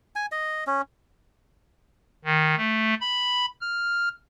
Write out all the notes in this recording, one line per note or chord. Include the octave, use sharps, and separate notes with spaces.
G#5
D#5
C#4
D#3
A3
B5
F6